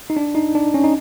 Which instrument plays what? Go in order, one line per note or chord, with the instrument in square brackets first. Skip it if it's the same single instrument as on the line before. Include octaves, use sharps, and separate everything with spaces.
[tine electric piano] D#4
D4
D#4
D4
C#4
D#4